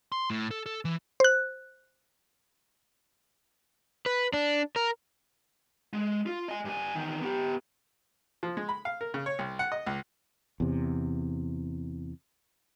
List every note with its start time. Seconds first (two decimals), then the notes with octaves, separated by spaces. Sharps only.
0.12 C6
0.30 A2
0.51 A4
0.66 A4
0.85 E3
1.20 C5 F#6
4.06 B4
4.33 D4
4.76 A#4
5.93 G#3
6.26 F4
6.48 D#5 G#5
6.65 G2 G#5
6.95 E2 D#3
7.21 B3 G4
8.43 F3
8.57 G#3
8.69 B5
8.85 F5
9.01 A#4
9.14 C#3
9.26 C#5
9.39 C2
9.59 F#5
9.72 D#5
9.87 C#2
10.60 E2 C3